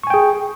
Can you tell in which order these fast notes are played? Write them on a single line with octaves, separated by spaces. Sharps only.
C#6 G#5 G5 G#4